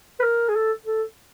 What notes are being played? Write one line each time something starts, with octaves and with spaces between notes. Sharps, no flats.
B4
A#4
G#4
A4
A4